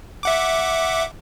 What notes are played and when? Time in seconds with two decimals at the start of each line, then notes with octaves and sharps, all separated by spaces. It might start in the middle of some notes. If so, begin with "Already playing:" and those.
0.23 E5 F#5 D6